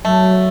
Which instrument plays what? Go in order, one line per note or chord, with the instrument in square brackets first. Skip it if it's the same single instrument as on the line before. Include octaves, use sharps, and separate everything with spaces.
[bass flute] F#3 [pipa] A3